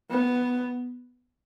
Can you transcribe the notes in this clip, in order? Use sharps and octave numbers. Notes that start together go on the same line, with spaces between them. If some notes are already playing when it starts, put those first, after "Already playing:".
B3